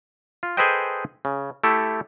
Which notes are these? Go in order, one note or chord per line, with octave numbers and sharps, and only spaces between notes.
F4
G#4 A4 B4 C5 D#5 G5
C#3
A3 E4 G4 A4